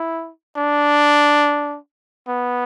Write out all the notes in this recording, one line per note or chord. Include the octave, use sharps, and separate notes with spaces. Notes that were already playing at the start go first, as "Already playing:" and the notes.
Already playing: E4
D4
B3